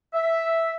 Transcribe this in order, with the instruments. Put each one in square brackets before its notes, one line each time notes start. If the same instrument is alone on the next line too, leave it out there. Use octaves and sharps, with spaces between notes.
[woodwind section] E5